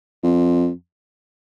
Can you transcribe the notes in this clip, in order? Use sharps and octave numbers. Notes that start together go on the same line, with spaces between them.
F2